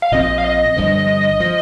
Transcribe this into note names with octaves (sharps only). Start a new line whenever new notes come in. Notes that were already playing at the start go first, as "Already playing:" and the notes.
F5
A#1 A#2 F3 C4 D#5
F5
D#5
G1 G2 F3
F3